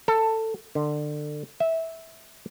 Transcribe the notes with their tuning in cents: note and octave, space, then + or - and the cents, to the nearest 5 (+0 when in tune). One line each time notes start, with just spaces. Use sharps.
A4 +15
D3 +25
E5 -15